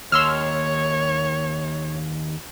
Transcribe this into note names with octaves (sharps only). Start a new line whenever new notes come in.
D#2 C#5 C6 E6 F6